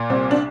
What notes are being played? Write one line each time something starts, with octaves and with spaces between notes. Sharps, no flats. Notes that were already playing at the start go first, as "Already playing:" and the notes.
Already playing: A#2
C2 C4
D4